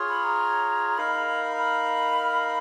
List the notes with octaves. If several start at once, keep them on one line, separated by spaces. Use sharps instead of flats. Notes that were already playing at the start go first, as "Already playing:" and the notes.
Already playing: F4 G#4 C#5
B5
A#5
D#4 A#4 F5 B5
B5